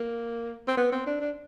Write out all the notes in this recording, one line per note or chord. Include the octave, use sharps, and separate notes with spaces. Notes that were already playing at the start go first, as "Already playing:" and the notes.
Already playing: A#3
C4
B3
C4
D4
D4